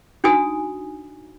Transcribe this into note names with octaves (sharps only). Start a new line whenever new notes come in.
D4 D#4 F#4 G#5 D#6